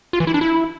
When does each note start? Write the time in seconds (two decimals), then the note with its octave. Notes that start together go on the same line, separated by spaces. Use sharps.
0.13 F4
0.20 E3
0.27 E4
0.34 D4
0.41 E4